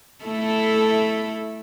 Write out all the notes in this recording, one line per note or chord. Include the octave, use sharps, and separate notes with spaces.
A3 E4 A4